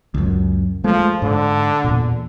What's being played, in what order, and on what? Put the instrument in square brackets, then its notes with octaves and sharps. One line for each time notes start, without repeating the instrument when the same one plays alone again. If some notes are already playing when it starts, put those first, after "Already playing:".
[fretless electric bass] C#2 F#2
[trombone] F3 [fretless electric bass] G#3 A3
[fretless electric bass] G#2 [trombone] D3
[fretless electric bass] E2 A#2